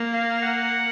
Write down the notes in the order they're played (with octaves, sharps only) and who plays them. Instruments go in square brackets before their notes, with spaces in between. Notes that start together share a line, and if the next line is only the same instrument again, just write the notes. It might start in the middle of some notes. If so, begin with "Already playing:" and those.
Already playing: [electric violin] A#3
[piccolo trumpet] F5
F#5